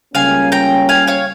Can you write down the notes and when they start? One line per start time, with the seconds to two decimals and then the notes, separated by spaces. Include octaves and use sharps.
0.14 C#2 C#3 G3 A#3 C#4 F5 G#5
0.52 G5 A#5
0.89 F5 G#5
1.07 C#5 F5